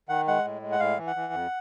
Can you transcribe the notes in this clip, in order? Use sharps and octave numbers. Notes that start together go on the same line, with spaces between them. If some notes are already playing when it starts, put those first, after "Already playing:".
D#3 F#5
G#3 F#5
A2
G#3
F#5
A2 F5
E3
F#5
E3
F2